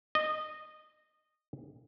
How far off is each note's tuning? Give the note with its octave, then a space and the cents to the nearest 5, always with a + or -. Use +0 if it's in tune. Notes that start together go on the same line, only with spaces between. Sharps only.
D#5 -15